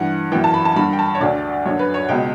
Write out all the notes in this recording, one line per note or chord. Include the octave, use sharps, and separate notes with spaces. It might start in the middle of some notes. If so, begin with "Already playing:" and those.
Already playing: G2 E3 F#5
F#2 E3 G5
A5
B5
A5
G2 D3 B5
G5
A5
C#5
D2 D3 D5
F#2 D3 C#5
B4
C#5
C#2 B2 G5